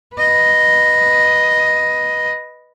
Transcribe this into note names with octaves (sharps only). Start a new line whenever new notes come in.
B4 D#5